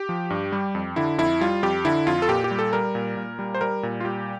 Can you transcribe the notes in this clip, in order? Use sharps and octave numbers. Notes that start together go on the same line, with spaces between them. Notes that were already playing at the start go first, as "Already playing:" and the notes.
Already playing: G4
F3
G2
G3
F2
D3 E4
F2 E4
G3 F4
F2 G4
D3 E4
F2 F4
A4
A#2 G4
G4
G3
A4
G3 A#4
A#2
A#2
G3
C5
G3 A#4
A#2
F4
G3 G4